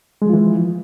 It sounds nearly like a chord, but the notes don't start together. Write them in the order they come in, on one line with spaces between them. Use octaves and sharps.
G#3 F3 F4 E3